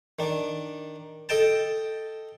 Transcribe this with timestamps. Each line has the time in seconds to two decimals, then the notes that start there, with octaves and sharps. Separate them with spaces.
0.19 D#3 D4
1.29 A4 D#5 G5 A5